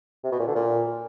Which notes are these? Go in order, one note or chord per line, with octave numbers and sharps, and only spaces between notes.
C3
B2
A#2
D3
A#2